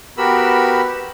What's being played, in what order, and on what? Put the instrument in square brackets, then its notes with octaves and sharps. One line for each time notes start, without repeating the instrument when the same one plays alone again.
[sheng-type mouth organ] B3 F#4 G4 A#4 B5 E6